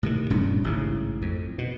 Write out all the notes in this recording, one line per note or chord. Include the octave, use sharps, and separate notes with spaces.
A2 C3 D#3
D#1 G2 B2 C#4
A1 G#2 C#3
F2
B2